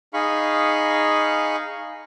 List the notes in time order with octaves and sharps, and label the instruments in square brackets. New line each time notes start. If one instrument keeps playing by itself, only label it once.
[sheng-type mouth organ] D#4 G#4 F5 B5 C#6